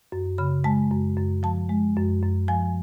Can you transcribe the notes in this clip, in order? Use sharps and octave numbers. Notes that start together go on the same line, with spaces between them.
F#2
C#3 B5
G#3 A5
F#2
F#2
F3 A5
G#3
F#2
F#2
F3 G#5